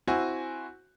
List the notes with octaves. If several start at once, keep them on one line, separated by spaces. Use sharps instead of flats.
C4 E4 F#4 G#5